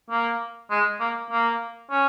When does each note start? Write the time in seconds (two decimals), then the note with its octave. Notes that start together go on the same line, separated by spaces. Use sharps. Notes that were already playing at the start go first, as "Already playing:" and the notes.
0.10 A#3
0.70 G#3
1.00 A#3
1.31 A#3
1.90 C#4